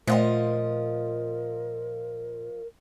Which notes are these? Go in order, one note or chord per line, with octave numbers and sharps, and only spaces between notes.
A#2 F3 A3 F4 A#4 D#5 F#5